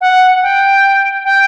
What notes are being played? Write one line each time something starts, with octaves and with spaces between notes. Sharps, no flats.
F#5
G5
G5